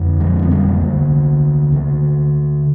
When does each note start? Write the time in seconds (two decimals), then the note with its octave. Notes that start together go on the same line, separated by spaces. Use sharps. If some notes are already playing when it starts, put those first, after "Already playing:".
Already playing: F2 D3
0.20 F3 G#3
0.42 C4
0.51 G3 A#3
0.81 D2 D3
1.72 D2 D3